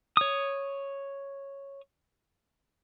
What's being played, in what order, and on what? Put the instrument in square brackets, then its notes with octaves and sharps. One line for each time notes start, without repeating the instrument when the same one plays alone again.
[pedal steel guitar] C#5 D#6